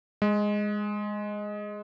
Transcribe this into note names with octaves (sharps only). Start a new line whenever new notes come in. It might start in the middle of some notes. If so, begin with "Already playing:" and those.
G#3